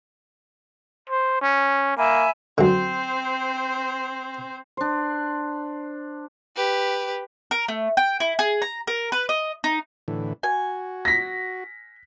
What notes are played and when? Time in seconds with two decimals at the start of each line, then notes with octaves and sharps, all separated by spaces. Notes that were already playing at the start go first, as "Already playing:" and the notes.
1.09 C5
1.42 C#4
1.97 A#3 E5 G#5 B5
2.58 F#2 D3 C4 C5
4.77 D4 C5
6.56 G4 B4
7.51 A#4
7.68 A3
7.97 G5
8.20 E4
8.39 G#4
8.62 A#5
8.87 A#4
9.12 B4
9.29 D#5
9.64 D#4
10.08 A2 D3 E3
10.43 F#4 G#5
11.05 A#6 B6